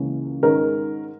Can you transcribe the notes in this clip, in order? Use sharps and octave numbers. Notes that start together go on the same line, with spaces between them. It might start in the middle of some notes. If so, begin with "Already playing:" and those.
Already playing: C#2 C#3 E3 A#3 C#4
G#2 D#3 G#3 C#4 A#4